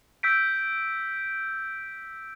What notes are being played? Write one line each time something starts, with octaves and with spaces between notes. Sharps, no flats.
E6 G6 B6 D7